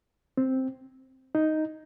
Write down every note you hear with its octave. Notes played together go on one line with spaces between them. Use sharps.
C4
D#4